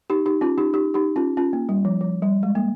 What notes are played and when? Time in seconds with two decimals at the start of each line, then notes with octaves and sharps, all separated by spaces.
0.10 D#4 G4
0.26 D#4 G4
0.41 C#4 F4
0.58 D#4 G4
0.74 D#4 G4
0.94 D#4 G4
1.16 C#4 F4
1.37 C#4 F4
1.53 A#3
1.69 G3
1.85 F3
2.01 F3
2.22 G3
2.43 G#3
2.55 A#3